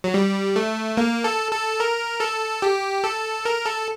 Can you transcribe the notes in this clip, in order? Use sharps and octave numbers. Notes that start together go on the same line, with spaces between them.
F#3
G3
A3
A#3
A4
A4
A#4
A4
G4
A4
A#4
A4